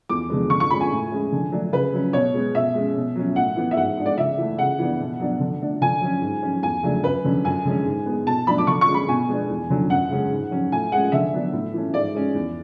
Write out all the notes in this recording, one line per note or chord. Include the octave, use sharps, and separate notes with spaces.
E2 D6
D3 G#3 B3
D3 C#6
C#6
G#3 C#4 B5
G#5
A2
G#3 C#4
D3
F#3 A3 D4
C#3 B4
F#3 C#4
B2 C#5
G#3 B3
B2 E5
G#3 C#4
B2
F#3 C#4
A2 F#5
E3 B3
E5
G#2 F#5
G#3 D4
D5
C#3 E5
E3 A3
C#3 F#5
E3 B3 D4
B2
F#3 B3 D4
D3
A3 D4
D3 G#5
F#3 C#4
G#2
F#3 C#4
E2 G#5
C#3 F#3 A3 D4
F#2 B4
D3 F#3 C#4
F#2 G#5
D3 G#3 C#4
G#2
G#3 B3
B2 A5
F#3 A3 D4 B5
D6
D3 C#6
C#6
G#3 C#4
B5
B2 G#5
G#3 B3 D4
E2
D3 F#3 C#4
F#2 F#5
C#3 G#3 C#4
G#2
F#3 C#4
A2 G#5
G#3 C#4 F#5
D3 E5
F#3 B3 D4
A2
E3 A3 C#4
G#2 D5
G#3 C#4
E2